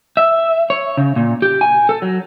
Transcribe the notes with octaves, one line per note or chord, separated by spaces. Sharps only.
E5
C#5
C#3
A#2
G4
G#5
A4
F#3